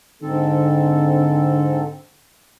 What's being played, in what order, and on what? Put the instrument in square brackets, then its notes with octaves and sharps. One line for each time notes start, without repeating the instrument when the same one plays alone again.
[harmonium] G#2 C4 A4 [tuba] D3